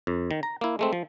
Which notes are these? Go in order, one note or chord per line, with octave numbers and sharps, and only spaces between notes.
F2
D#3
A#5
A#3 E4
G#3 A3 C4
F3